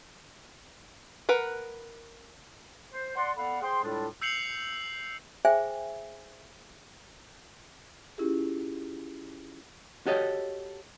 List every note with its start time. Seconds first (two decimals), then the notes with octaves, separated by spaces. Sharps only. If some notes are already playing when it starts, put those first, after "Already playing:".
1.29 A#4 B4 F#5
2.92 C5
3.17 D5 F#5 C6
3.36 B3 A4 D5 F5 F#5 B5
3.62 G#4 C5 G5 C6
3.84 A2 G3 G#3 D4 F4 A4
4.22 E6 G6 C7 C#7 F7 F#7
5.45 G#4 C5 E5 G5 G#5
8.18 C#4 E4 F4 G4 G#4
10.06 F#4 G4 A4 C#5 D#5